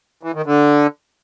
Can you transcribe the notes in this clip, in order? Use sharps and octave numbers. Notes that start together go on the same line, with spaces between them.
E3
D#3
D3